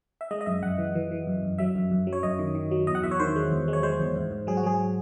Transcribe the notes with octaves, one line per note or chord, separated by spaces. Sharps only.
E5
G#3 D#5
D#5
F#2 E5
F#2 F#5
E3
E3
E3
F#2
F#2
F#3 E5
F#2
F#2
F#3
C#5
F#2 D#5
D#3
D#3
F#3
E2 D#5
F#5
E2 E5
C#5
D#3 C5
G#3
E2
G#3
C#5
G#3 C5
E2
G#2
G#2
F#3 G#4
F#4
F#3 G#4